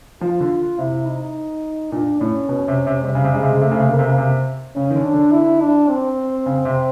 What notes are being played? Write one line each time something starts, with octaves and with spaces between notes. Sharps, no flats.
F3 F4
D3
C3 E4
D#4
A#2 D4
A2 C#4
B2
C3
C3
C3 G3
C#3
C3
C#3 G#3
C3
C#3
C3 A3
C#3
C3
C#3 A#3
C3
C#3
C3
C#3 C#4
D#3
D3
D4
D3
E4
D4
C4
C#3
C3